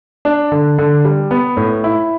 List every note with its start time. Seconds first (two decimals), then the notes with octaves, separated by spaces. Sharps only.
0.25 D4
0.52 D3
0.78 D3
1.05 G3
1.31 B3
1.57 A2
1.84 E4